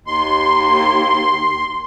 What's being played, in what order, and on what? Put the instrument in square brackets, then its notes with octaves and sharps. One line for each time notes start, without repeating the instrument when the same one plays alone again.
[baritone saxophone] D#2 [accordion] C6